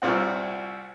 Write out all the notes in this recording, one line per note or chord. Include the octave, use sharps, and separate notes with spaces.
C2 A#2 C4 F#4